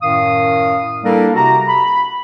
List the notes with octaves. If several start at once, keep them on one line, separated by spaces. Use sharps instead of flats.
F#2 A2 D#3 F5 D#6
G3 A#3 D4 E4 A4 A#4
C3 F#4 G4 A#5
B5